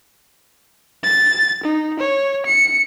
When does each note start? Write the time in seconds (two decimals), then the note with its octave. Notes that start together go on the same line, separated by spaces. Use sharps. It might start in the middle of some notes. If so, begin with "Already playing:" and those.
1.03 A6
1.63 D#4
2.00 C#5
2.46 C#7